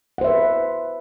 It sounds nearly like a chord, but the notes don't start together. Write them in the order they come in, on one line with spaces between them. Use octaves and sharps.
F#5 C5 E5 B4